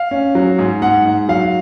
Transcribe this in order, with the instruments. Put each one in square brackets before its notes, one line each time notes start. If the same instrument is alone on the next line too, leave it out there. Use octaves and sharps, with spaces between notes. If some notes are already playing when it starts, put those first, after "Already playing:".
Already playing: [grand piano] F5
C#4
F#3
G#2
G#2 F#5
G#2
F#3 F5